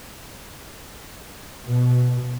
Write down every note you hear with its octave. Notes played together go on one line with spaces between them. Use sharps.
B2